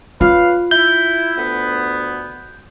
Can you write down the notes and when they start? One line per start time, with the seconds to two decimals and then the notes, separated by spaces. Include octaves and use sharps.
0.21 F4 B4 C#5 F5
0.71 E4 G6
1.36 D2 B3